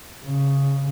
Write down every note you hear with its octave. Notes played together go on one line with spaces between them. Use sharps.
C#3